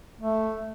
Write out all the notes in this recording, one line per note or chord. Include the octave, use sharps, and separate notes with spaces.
A3